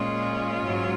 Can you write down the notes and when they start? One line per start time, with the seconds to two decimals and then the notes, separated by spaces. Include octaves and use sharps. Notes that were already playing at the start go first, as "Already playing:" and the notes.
Already playing: A#2 G#3 C#4 F4
0.64 G#2 F#3